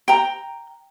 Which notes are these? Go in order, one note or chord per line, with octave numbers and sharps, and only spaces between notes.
G5 A#5